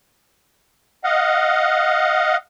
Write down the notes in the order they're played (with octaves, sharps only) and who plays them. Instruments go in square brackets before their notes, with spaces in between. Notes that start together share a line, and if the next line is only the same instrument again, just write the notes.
[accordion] D#5 F5 F#5